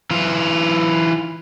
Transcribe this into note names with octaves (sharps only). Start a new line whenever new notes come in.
E3 F4